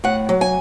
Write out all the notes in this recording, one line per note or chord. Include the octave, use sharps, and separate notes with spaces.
A2 F#5
F#3
G#5